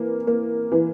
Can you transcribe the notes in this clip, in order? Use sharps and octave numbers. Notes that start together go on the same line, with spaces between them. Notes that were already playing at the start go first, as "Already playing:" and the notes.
Already playing: E3 A#3
A#3
E3